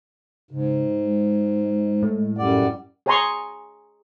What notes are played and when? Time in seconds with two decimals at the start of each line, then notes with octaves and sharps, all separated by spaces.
0.51 G#2 C#3
1.03 G#3
2.02 A2
2.38 F#2 G3 D5 F#5
3.06 G#4 C#5 G#5 A#5 C6 C#6